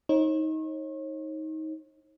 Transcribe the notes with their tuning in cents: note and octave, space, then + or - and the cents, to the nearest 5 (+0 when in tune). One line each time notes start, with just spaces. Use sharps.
D#4 +20 C#5 -40